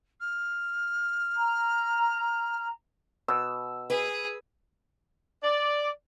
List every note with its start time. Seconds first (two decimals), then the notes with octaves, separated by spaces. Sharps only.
0.21 F6
1.36 A#5
3.28 B2 E6
3.90 G#4 B4
5.43 D5